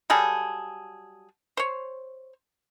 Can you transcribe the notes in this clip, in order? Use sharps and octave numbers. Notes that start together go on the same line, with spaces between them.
F#3 G3 G#4 A4
C5 C#5